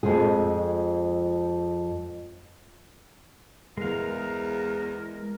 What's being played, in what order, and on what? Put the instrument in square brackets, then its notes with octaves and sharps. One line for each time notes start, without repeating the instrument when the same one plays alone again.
[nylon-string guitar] F2 F3 G#3 G#4
[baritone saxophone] E2 [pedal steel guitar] G#3 F5 [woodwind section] A#4